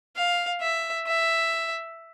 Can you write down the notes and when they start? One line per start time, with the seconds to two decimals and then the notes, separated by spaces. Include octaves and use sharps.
0.16 F5
0.61 E5
1.07 E5